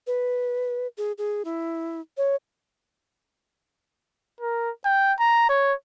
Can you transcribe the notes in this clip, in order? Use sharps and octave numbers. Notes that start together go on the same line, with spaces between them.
B4
G#4
G#4
E4
C#5
A#4
G5
A#5
C#5